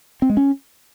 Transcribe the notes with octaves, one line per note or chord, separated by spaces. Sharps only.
C4
G#3
C#4